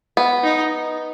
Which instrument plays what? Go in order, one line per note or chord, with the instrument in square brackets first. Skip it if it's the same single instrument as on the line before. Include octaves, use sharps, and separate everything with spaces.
[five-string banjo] B3
[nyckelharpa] D#4